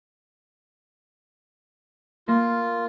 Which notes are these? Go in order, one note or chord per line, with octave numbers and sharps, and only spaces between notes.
A#3 F4